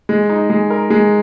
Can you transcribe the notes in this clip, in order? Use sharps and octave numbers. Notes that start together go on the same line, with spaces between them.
G#3
D#4
G#3
A#4
G#3